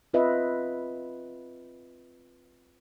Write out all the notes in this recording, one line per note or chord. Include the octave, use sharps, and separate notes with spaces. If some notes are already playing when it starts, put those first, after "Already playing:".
C4 F4 B4 D#5 E5